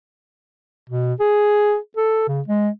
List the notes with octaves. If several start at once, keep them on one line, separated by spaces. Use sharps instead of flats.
B2
G#4
A4
C#3
G#3